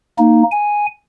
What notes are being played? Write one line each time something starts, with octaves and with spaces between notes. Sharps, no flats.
A#3 D#4
G#5